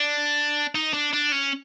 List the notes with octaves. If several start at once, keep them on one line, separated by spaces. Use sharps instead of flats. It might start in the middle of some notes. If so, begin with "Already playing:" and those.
Already playing: D4
D#4
D4
D4
C#4